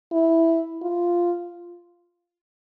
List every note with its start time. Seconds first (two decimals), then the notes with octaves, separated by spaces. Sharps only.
0.12 E4
0.82 F4